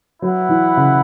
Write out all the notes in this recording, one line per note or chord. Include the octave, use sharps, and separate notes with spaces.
F#3 E4 B4 F#5
E3
C#3